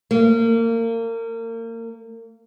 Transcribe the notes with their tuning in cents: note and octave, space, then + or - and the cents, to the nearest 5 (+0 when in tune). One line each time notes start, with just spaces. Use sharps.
A#3 -30